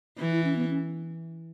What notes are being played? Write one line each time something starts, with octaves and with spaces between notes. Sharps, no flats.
E3
E4
C#4
B3
C#4